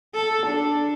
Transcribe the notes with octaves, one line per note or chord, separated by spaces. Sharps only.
A4
D4